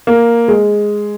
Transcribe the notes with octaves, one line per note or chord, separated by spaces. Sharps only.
A#3
G#3